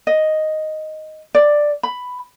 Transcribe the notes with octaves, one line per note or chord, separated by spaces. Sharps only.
D#5
D5
B5